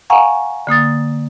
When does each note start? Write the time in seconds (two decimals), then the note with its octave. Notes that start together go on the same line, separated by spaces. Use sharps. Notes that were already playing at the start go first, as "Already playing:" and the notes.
0.10 F5 F#5 G#5 A#5 C#6
0.67 D3 A#3 D#6 A6